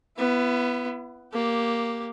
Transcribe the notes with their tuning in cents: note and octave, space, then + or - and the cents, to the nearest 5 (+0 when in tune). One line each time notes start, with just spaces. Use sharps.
B3 +5 E4 +35
A#3 +0 G4 +0